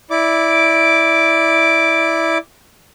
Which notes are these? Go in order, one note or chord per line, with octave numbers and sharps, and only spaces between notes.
E4 D5 D6